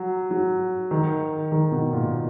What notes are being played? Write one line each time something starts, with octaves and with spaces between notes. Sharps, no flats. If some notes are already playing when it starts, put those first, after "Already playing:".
Already playing: F#3
F#3
D#3
D#3
B2
A#2